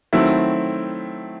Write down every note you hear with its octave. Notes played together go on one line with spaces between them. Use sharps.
D#3 F#3 A3 C4 E4